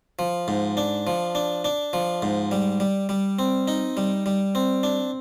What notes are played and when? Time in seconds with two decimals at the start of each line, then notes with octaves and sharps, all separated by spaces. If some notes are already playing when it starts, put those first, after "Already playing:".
0.19 F3
0.48 G#2
0.77 D4
1.07 F3
1.35 D4
1.64 D4
1.93 F3
2.22 G#2
2.51 G3
2.80 G3
3.09 G3
3.39 C4
3.68 D#4
3.97 G3
4.26 G3
4.55 C4
4.83 D4